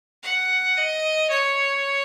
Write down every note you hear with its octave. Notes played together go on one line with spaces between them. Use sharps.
F#5
D#5
C#5